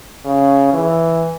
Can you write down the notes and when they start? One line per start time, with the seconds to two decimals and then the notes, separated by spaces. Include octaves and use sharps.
0.25 C#3
0.73 E3